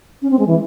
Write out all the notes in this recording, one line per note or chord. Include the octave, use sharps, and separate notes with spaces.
C#4
C4
G#3
E3